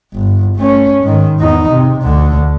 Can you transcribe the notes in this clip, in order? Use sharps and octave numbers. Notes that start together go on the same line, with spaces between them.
G1
A3 C#4
G#2 D#3
E2 D#4
C3
D2 D3